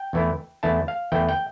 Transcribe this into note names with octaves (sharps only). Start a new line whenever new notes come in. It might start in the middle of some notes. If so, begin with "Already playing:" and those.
Already playing: G5
E2 E3 A3 E4
E2 E3 A3 E4 A5
F5
E2 E3 A3 E4 G5
G5